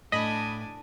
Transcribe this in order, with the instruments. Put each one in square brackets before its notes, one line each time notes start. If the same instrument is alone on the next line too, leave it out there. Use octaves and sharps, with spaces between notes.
[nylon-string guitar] A2 [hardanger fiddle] D4 G#5 [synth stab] D#5 B5